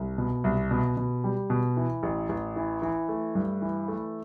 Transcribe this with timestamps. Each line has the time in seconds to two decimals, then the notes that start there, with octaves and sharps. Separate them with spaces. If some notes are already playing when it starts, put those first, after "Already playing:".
Already playing: C2
0.18 B2
0.44 C2
0.71 B2
0.97 B2
1.24 G3
1.50 B2
1.77 E3
2.03 A1
2.29 A1
2.56 E3
2.82 E3
3.09 A3
3.35 G2
3.62 E3
3.88 A3